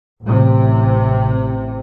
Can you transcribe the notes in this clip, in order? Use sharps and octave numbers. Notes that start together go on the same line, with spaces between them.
A1 C3